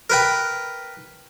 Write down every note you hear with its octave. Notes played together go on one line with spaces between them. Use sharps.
A#4 B4 G5